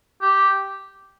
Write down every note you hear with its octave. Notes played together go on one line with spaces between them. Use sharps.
G4